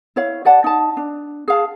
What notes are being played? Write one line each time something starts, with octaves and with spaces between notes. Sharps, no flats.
E4 C#5 F5
G4 D5 F#5 A5
D#4 A5
D4
G#4 F5 A5